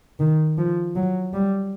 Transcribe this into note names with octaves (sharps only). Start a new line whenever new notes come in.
D#3
F3
F#3
G3